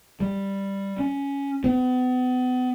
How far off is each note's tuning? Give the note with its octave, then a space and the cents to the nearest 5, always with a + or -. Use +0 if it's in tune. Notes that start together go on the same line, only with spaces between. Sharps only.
G3 +5
C#4 +10
B3 +35